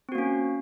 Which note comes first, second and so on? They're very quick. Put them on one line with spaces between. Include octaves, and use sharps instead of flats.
C4 F#4 A#3 C#4